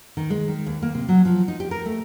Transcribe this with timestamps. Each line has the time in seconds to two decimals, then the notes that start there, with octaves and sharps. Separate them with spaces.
0.17 D#3
0.30 G#3
0.48 D#3
0.66 D#2
0.82 A#3
0.95 C3
1.08 F#3
1.25 F3
1.48 D#4
1.60 G4
1.71 A#4
1.86 A3